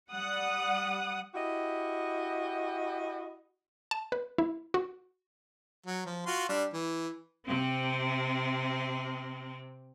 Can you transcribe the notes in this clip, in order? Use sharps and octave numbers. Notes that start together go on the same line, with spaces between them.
G3 F#5 D#6
E4 F#4 G4 D#5
A5
B4
E4
F#4
F#3
F3
F4 F#4 C6
G3 D4
E3
C3 C4